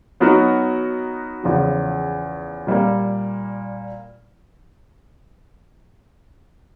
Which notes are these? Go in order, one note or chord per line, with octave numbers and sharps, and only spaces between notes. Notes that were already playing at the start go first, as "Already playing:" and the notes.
F#3 B3 D#4 F#4 A#4
E2 C#3 F3
A#2 G3 A#3